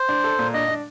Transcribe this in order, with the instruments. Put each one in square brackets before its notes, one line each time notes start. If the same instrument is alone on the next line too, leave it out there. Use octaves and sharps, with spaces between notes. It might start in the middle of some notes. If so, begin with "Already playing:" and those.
Already playing: [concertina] C5
[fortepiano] D4
A4
A#2
[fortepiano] D4 [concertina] D#5
[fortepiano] D4